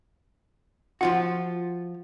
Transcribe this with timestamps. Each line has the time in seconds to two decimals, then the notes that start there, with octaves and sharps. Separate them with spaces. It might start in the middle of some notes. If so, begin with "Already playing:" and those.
1.01 F3 F4 F#4 F#5